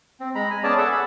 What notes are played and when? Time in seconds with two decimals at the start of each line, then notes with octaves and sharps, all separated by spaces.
0.20 C4
0.35 G#3 A#5 B5
0.50 G#5
0.63 B3 C#4 G#4 D5 A5
0.78 G#4 A4 E5 F#5 A5
0.91 B5